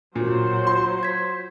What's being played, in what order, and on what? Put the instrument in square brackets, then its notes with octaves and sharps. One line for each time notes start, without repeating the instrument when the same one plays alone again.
[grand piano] A#2 [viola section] F#3 C5
[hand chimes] F4 [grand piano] C6
[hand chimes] G#6 B6